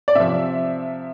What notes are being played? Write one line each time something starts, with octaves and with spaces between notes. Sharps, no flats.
D5
C3 F3 E5